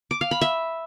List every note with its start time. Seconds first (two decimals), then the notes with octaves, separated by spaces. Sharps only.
0.11 D6
0.21 F5
0.31 B5
0.41 E5